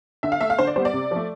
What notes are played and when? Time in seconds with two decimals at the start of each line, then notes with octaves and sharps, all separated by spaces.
0.23 D3 E5
0.32 F5
0.41 A3 E5
0.50 F5
0.58 D3 C5
0.67 D5
0.76 G3 B3 C5
0.85 D5
0.93 C3
1.11 F3 A3